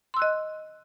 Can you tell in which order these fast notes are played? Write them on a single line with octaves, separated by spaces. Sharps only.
C6 E6 F#6 D#5